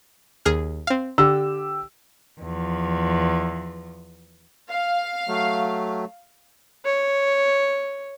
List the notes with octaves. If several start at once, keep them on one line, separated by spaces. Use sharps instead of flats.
D#2 G#4 F6
C4 F5
D3 G4 E6
E2 F3
F5
F#3 A3
C#5